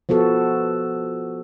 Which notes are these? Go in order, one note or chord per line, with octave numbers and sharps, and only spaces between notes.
F3 B3 F#4 A4